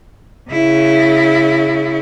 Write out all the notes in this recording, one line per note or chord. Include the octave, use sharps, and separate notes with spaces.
C#3 E4